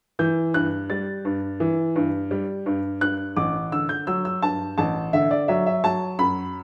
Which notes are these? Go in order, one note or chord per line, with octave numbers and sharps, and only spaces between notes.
E3 G6
G2 F#6
G3 A6
G2
E3
G2
G3
G2
G2 F#6
A1 D6
D3 E6
G6
F#3 E6
E6
G2 A5
A1 A5
D3 E5
D5
F#3 E5
E5
F#3 A5
F#2 B5